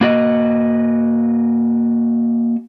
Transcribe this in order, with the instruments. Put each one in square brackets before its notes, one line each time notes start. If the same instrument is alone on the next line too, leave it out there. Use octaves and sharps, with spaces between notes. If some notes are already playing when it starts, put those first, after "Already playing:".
[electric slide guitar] A#3 F#4 D#5